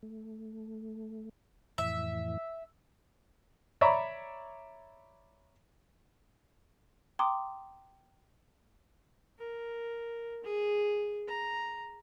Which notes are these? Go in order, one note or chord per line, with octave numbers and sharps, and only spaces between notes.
A3
F2 A2 E3 E5
C#5 D5 E5 A#5 B5 C#6
G5 A#5 C6 D6 D#6
A#4
G#4
A#5